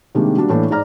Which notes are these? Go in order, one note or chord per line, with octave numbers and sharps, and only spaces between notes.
C3 D#3 G3 G#3 A#3 D4
G3 A#3 D4 F#4
A2 E3 A#3 D4
G#2 D5 A#5 F6